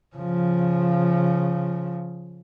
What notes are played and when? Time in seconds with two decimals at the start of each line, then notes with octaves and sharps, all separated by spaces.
0.16 C#3 F3